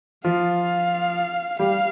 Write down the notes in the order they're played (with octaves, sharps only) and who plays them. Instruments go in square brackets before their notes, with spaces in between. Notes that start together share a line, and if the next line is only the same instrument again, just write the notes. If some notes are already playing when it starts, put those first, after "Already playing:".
[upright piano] F3 F4 [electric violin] F5
[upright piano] G3 G4 [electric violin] F5